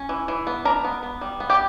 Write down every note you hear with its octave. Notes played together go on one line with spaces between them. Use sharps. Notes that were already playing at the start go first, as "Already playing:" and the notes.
Already playing: C#4
E3
E3
B3
D4 A#4 A#5
B3
B3
G3
B3
G4 G5